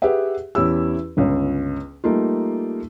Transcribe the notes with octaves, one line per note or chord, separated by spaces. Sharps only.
G4 G#4 B4 E5 F#5
E2 E3 C#4 E4 G4 E6
G1 C#2 C#4
G3 A3 A#3 D#4 F4